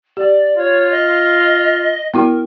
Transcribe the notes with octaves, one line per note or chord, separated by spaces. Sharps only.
G4 D5
F4 C#5
D#5
B3 E4 F#4 A#4